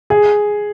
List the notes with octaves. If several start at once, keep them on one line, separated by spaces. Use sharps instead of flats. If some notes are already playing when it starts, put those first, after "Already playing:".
G#4